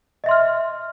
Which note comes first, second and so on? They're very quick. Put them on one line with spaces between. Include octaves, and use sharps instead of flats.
D#5 E5 C6 F6